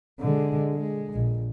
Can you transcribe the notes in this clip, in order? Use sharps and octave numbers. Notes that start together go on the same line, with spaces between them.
D3 G#3
G#3
A#1